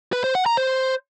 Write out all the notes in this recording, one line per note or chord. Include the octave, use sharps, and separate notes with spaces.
B4
C5
F#5
A#5
C5